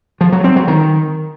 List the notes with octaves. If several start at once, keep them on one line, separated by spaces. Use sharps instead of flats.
F3
F#3
C4
F#3
D#3